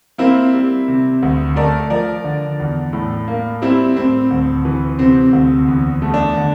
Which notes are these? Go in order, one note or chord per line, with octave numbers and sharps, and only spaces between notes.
A#3 C4 E4
G3
C3
D2
A3 A#4 D5
F3 A#4 D5
D3
E2
A2
A#3
G3 C4 E4
A2 C4
D2
E3
C3 C4
D2
E2
A3
D4
D3